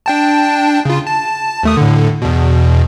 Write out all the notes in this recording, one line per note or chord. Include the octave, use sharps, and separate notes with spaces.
D4 G5 A5
C#3 F4
A5
D#2 A3 D#6
A2 D3
E2 B2